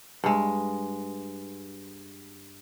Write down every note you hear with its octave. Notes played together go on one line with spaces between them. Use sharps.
G2 G#3